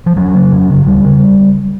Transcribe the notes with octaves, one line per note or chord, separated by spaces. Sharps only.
F3
F2 F#3
C#3
F2
C#3
D2 G3
C#3